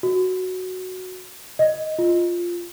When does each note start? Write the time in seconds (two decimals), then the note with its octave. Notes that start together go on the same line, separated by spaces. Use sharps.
0.03 F#4
1.59 D#5
1.98 F4